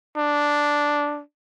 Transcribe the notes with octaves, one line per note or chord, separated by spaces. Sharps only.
D4